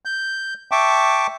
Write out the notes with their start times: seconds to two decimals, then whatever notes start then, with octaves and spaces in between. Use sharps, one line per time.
0.05 G6
0.71 E5 G5 A5 C#6 D6